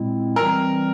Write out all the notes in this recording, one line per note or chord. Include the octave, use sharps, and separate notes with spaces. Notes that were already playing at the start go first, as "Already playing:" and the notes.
Already playing: A#2 G#3 C4 E4
E3 G3 C4 A#4